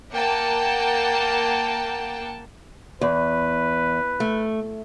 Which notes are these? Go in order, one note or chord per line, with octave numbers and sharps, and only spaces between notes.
A#3 F#5 G5 A5
E2 B4
A3